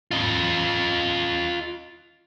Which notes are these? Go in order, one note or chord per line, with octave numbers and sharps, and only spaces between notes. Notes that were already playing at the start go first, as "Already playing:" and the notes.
F4 D#5